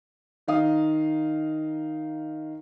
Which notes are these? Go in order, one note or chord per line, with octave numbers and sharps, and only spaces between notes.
D#3 D#4 F5 D#6